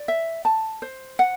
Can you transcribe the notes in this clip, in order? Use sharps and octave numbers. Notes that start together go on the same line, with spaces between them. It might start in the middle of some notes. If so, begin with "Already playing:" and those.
Already playing: D5
E5
A5
C5
F#5